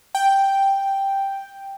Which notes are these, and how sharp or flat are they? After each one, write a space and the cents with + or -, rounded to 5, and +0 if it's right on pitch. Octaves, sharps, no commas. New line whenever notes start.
G5 +0